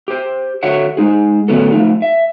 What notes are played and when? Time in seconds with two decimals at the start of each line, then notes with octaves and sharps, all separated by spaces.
0.08 G4 C5
0.63 D3 F#4 C#5 E5 F#5
0.97 G#3 D#4 G#4
1.48 A2 D3 F#3 B3 C#4 A4
1.72 F3 A3 D#4
2.02 E5